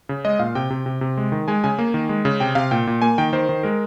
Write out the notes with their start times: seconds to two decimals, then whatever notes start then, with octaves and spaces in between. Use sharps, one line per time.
0.09 C#3
0.25 G#3 D#5
0.39 A#2 F5
0.55 C3 G5
0.70 C3
0.86 C3
1.01 C3
1.17 G#3
1.32 D#3
1.48 G#3 G#5
1.64 C#3 G#5
1.79 A#3
1.94 D#3
2.09 G#3
2.25 C#3
2.40 C3 G5
2.55 C3 F5
2.71 A#2 G5
2.87 A#2
3.02 A#3 G#5
3.18 D#3 G5
3.33 D#3 C5
3.49 D#3
3.63 G#3 A#4